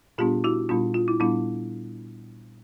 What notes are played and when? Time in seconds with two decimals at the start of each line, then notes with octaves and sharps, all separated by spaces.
0.18 A#2 G3 B3 D4 F4 G4
0.44 E4 F#4
0.69 A#2 G3 B3 D4 F4
0.94 F4
1.08 E4
1.20 A#2 G3 B3 D4 E4